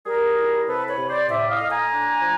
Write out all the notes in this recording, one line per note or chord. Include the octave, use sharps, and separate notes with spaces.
G3 G#4 A#4
E4
C3 A4 B4
B4 C#5
C3
C5 D5
A2 D5 E5
D#5 F5
A2
G#5 A#5
D4
F3